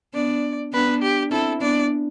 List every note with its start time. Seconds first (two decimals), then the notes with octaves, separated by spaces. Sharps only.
0.13 B3 D4 D5
0.72 B3 D4 B4
1.02 G4
1.31 C4 E4 A4
1.61 B3 D4 D5